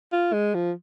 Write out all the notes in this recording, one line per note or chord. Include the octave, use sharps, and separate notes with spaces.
F4
G#3
F3